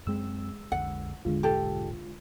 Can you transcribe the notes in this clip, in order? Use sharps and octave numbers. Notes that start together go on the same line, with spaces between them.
F#2 G#3 C4 E6
B1 F2 D3 F#5
G#1 E2 D3 G#3 F4
D#1 B1 G#2 G4 A4